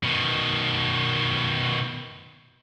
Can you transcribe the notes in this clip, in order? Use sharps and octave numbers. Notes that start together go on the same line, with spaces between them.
B2 D#3